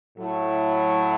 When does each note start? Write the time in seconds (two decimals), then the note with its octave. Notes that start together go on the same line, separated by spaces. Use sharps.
0.18 A2 F#3 A3 E4